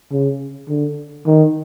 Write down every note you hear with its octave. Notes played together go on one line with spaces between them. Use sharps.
C#3
D3
D#3